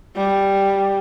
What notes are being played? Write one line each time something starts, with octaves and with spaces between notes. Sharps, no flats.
G3